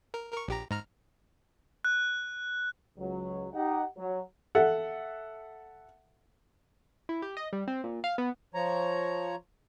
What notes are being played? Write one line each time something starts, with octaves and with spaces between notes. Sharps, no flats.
A#4
A#4 C#6
A#1 G4 A#5
G#2 A#5 F6
F#6
C#2 F#3
D#4 G4 F#5
F#3
A4 E5 F#5
E4
G4
D#5
G3
C4
A#2
F5
B3
F3 C#5 A#5